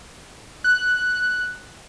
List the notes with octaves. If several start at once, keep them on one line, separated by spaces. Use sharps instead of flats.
F#6